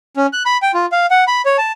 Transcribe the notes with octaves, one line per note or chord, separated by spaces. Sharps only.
C#4
F#6
B5
G5
F4
F5
F#5
B5
C#5
A5